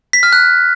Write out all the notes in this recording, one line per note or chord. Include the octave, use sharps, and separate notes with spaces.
B6
F6
F#6